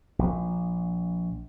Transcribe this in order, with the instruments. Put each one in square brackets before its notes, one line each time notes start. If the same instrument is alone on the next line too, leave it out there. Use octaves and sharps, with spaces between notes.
[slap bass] A#1